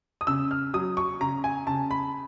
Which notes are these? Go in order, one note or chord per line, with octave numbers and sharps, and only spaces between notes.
D#6
C#3 E6
F6
F#3 D#6
C#6
C#3 A#5
G#5
C#3 A5
B5